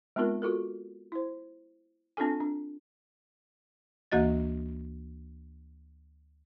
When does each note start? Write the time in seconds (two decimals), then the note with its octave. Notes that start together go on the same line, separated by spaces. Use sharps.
0.16 G#3 B3 C4 D#4 F4 A#4
0.42 F4 F#4 A4 A#4
1.12 E4 C5
2.17 C4 D4 F4 A4 G#5
2.40 D4
4.12 D2 E3 A#3 F#4 D#5 A6